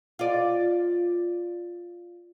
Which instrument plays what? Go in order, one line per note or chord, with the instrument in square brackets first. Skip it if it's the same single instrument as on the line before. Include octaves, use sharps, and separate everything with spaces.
[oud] F4 D5